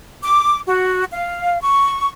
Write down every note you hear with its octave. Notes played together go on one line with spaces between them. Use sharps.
D6
F#4
F5
C#6